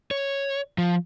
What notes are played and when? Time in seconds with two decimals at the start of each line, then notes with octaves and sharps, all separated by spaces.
0.11 C#5
0.78 F3